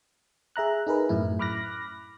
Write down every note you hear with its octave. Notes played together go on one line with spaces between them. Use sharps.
G#4 E5 A#5 F#6
D#4 G#4 A#4 B4
F#2 A2 E4
B5 D6 F6 F#6 A#6